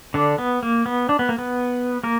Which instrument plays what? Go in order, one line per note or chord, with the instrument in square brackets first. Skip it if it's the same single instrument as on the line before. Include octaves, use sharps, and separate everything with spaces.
[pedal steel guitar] D3 D4
B3
A#3
B3
D4
B3
A#3
B3
A#3 A#4